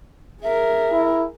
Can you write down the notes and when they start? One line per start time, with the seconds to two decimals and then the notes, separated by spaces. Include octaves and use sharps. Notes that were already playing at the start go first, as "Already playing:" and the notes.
0.43 G#4 A#4 E5
0.92 E4